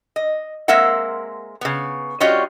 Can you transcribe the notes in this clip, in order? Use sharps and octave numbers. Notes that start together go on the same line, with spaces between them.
D#5
G#3 A#3 C4 A#4 E5 F#5
C#3 B3
G3 C#4 F4 F#4 C#5 D#5